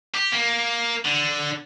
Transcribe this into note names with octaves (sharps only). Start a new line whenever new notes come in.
G4
A#3
D3